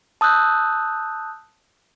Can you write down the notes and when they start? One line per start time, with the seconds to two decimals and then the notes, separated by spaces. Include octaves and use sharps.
0.21 A5 D#6 E6 F#6 G6